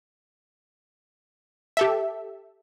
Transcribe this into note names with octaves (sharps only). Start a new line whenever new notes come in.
G4 A4 E5